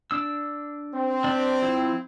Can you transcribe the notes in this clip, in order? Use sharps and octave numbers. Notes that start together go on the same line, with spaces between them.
D4 E6
C4
D4 G4
F3 E4